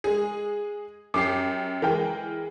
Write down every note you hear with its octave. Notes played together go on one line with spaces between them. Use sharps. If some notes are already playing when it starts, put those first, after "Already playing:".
G#3 G#4
F#2 G4 D6 C7
E3 G#3 A#4 G5